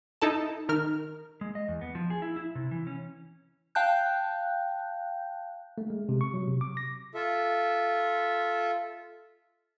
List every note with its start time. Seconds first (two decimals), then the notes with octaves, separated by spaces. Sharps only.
0.22 D#4 E4 A4 A5
0.69 D#3 A#4 F6
1.41 G#3
1.55 D#5
1.68 E2
1.81 B3
1.95 F3
2.10 G#4
2.22 E4
2.36 E4
2.55 C3
2.71 E3
2.87 C#4
3.75 F5 G5 A5 F#6 G6
5.78 A3
5.90 G#3
6.09 C3
6.21 C#6
6.34 F#3
6.48 C3
6.61 D6
6.77 A#6
7.14 F4 A4 E5